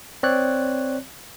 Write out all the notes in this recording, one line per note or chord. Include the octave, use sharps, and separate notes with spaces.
C4 C#5 D5 F#6